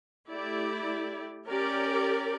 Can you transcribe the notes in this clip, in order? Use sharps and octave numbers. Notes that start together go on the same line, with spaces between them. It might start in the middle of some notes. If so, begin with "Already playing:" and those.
A3 E4 G4 D5
C#4 G4 A#4 D5